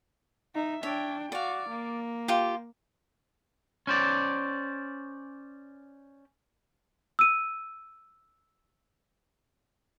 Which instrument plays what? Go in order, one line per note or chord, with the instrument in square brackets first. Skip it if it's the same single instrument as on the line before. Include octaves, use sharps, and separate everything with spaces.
[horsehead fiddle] D#4 E5
[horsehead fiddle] D4 G5 [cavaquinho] C#5 E5
[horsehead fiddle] F#4 [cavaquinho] D5 F5
[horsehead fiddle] A#3
[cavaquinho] F4 G4
[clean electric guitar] C#4 C5 D5
[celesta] E6 D#7